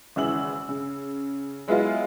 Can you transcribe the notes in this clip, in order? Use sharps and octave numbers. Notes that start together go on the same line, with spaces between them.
G#1 C#3 E3 E6 F#7
C#3
F#3 G#3 B3 E4 F4 F5